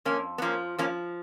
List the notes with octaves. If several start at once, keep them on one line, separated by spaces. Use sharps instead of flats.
F2 A#3 C#4
B3
F3 A#3 C#4
F3 A#3 C#4